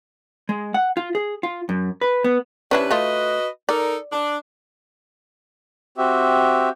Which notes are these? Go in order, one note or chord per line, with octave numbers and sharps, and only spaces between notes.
G#3
F#5
F4
G#4
F4
F#2
B4
B3
C3 C#4 D4 E4 B4
A3 F4 F#4 B4 D#5
D#4 A4 A#4 D5
D4
C4 F#4 G4 E5